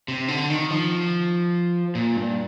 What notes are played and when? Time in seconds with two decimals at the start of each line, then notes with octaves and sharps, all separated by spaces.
0.08 C3
0.28 D3
0.50 D#3
0.70 F3
1.95 A#2
2.16 G2